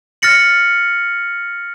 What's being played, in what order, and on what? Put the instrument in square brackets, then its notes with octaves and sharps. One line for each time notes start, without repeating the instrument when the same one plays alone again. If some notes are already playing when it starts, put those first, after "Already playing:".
[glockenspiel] F6 A6 A#6 C#7 F#7